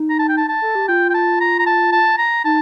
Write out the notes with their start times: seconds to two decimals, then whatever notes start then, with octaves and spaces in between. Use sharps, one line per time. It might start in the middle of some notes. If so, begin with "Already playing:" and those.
Already playing: D#4
0.10 A#5
0.19 A5
0.29 G5
0.38 A5
0.49 A5
0.62 A4
0.75 G4
0.88 F4 G5
1.10 G5
1.14 A5
1.41 A#5
1.59 A#5
1.66 A5
1.92 A5
2.18 A#5
2.44 D#4 A5